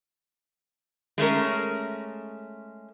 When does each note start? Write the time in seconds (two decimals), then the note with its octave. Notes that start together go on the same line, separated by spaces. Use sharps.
1.18 G#3 A3 C#4 A#4